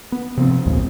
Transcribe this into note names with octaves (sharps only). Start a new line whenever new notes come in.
B3
C3 F3 C4
A#1 D#2 A#2 G#3